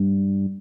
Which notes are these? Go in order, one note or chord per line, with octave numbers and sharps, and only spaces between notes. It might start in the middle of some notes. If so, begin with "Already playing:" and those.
Already playing: G2